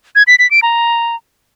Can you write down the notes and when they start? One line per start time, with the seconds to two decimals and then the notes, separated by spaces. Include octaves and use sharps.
0.15 G#6
0.27 B6
0.39 B6
0.51 D7
0.62 A#5